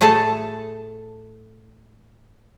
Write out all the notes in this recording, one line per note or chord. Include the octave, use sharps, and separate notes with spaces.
A2 A3 G#4 A4 A5